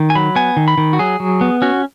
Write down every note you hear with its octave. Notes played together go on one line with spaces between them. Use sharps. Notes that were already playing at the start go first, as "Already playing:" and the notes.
Already playing: D#3
G#5
F#3 B5
B3 G#5
D#3
B5
D#3
F#4
F#3 G#4
F#3
B3
C#4 F#4